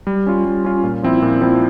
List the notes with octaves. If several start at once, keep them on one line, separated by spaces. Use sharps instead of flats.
G3
C#4 F4
G3
C#4 F4
A#2
F3 C4 E4
A#2
F3 C4 E4